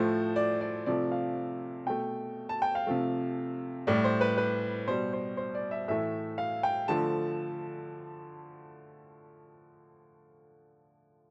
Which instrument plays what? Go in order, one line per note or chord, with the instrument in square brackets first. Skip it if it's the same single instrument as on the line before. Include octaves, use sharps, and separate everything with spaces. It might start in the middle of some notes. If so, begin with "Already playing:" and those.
Already playing: [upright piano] A2 F3 A3 C5
D5
D5
C3 F3 A3 D5
F5
B2 A3 G5
A5
G5
F5
C3 F3 A3
A2 G3 D5
C5
B4
B4
B2 G3 C5
C5
C5
D5
E5
A2 E3 A3 E5
F5
G5
D3 F3 A3 A5